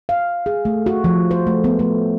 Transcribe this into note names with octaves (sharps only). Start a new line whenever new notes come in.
F5
G#4
A3
F#4
F3
C5
A3
B3
A3